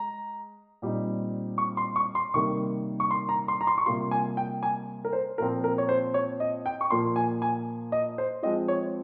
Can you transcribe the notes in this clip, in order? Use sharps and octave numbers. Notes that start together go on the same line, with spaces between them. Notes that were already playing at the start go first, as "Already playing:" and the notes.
Already playing: G#3 A#5
A#2 G3 C4 D#4
C#6
C6
C#6
C6
C3 D#3 G3 A#3 C#6
C#6
C6
A#5
C6
A#5
C6
C#6
C3 G3 A#3 F4 C6
G#5
G5
G#5
A#4
C5
A#2 F3 C4 A#4
A#4
C#5
C5
C#5
D#5
G5
C#6
A#2 F3 A#3 C6
G#5
G#5
D#5
C5
F3 G#3 C4 F4 D#5
C#5